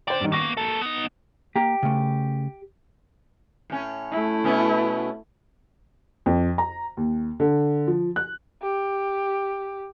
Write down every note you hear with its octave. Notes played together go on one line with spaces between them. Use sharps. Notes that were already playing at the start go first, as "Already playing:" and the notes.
D3 C5 D5 G5
G2 D#3
A#3 B3 C#6 A#6
A#3 A4
B3 D#4
A#3 G4 A#5
C#3 A3
A2 C#4
A3 E4
B2 B3 C#4
F2
A#5
D#2
D3
F3
F#6
G4